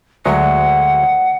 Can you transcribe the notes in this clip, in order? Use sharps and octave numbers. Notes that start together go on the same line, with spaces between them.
D2 F#3 G#3 F#5